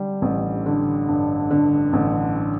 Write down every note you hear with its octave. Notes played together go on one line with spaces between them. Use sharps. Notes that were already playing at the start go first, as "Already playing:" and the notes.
Already playing: D3 G3
A1
D3
G2
D3
A1